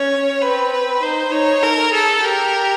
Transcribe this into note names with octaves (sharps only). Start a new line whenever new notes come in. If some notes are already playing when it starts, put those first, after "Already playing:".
Already playing: C#4 C#5
C4 B4
B4
D#4 C5
D#4 C#5
A4 A#4
G#4 A4
G4 A#4